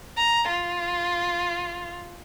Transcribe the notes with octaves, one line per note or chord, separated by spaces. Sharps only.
A#5
F4